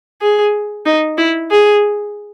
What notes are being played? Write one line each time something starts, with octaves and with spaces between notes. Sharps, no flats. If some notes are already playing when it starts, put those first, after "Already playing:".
G#4
D#4
E4
G#4